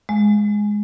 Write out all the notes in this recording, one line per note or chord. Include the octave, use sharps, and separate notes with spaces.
G#3